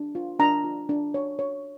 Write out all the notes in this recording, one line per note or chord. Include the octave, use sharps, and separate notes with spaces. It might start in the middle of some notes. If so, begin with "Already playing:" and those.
Already playing: D4
F4
D4 A#5
F4
D4
C#5
C#5